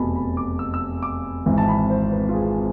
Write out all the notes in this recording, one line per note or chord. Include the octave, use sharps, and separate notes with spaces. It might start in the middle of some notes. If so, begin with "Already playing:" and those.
Already playing: F1 E2 B2 A5 B5
B5
D6
E6
E6
D6
G#1 G#2 E3
A5
B5
C5
B4
F4
G#4